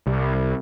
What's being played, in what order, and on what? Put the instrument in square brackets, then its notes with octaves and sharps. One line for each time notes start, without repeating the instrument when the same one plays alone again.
[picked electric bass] C2